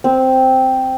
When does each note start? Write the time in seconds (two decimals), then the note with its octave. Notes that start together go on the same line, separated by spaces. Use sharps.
0.04 C4